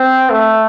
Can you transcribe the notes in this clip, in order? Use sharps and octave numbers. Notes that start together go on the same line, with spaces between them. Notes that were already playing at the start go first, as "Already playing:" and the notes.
Already playing: C4
A3